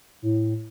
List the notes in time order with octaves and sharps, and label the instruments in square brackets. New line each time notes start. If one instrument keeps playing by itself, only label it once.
[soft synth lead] A2